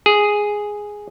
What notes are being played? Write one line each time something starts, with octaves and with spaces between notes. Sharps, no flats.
G#4